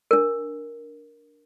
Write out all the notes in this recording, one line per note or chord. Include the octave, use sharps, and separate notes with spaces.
D4 A#4